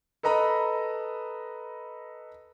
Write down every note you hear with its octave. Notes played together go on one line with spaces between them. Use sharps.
A4 B4 D#5 A#5 B5